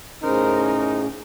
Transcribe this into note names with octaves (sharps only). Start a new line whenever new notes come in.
A2 C#3 C#4 D#4 A#4 C5